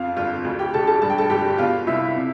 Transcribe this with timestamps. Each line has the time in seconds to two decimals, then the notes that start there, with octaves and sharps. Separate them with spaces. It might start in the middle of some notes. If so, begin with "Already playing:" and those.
Already playing: F2 F4 F5
0.16 G1 F4 F5
0.45 D2
0.59 G4 G5
0.73 E1 A4 A5
0.87 A4 A5
1.02 G2 A5
1.10 G5
1.18 A4 A5
1.30 G1 G4 G5
1.58 B2 F4 F5
1.87 C2 E4 E5
2.16 C3